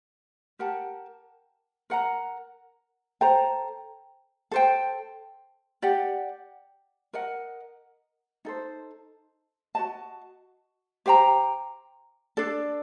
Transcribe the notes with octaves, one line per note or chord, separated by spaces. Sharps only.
G4 A#4 F#5 A5
A#4 F#5 A#5
A4 C5 G5 A#5
A4 C5 G5
G4 D5 F#5
A#4 D#5 F#5
D#4 A4 C5
F#4 C5 D#5 A5
G4 C5 G5 A#5
D4 A4 D5